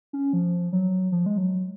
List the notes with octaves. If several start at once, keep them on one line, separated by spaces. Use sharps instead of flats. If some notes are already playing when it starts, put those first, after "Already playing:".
C#4
F3
F#3
F3
G#3
F#3